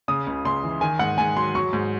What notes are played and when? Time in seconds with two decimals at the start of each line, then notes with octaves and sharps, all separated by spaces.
0.08 C#3 D#6
0.27 C#2
0.45 C#2 C6
0.64 E3
0.81 D#3 G#5
0.99 G#2 F#5
1.18 G#2 G#5
1.36 F#3 C6
1.55 F#3 C#6
1.73 G#2